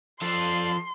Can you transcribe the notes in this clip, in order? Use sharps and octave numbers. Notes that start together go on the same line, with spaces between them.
F3 A4 D5 F5 C6